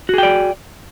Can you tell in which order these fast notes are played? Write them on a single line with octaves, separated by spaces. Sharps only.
F#4 G#4 G5 D5